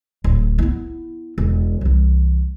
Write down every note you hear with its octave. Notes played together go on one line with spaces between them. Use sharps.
D1
B3 E4
E1
C2 E3